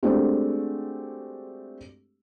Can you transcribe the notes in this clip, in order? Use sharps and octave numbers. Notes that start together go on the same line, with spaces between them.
G#3 A3 C4 D4 F#4 G4